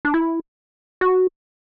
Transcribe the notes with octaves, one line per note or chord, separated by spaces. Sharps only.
D4
E4
F#4